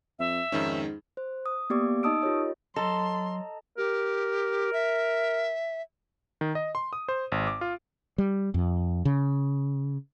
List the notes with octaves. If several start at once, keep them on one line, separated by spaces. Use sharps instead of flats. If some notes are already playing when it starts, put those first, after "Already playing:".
F2 E5
F2 G#2 D#3 C#4
C5
D#6
A#3 B3 G4 D5 D6
D#4 D#5 A5 D#6 E6 D7
F4 G4 A#4 C#5 D#5
F#3 A4 D#5 A5 A#5 C6
G4 A#4
E5
D#3
D#5
C6
D#6
C5
G#1
D6
F4
G3
F2
C#3